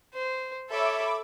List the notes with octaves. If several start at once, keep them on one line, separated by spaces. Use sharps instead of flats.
C5
A4 C#5 E5 B5 D6